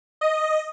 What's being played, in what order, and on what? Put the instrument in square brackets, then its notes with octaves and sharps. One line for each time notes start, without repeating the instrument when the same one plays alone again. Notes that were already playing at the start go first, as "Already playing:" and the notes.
[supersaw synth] D#5